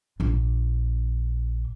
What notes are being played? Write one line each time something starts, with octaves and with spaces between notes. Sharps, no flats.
A#1 D4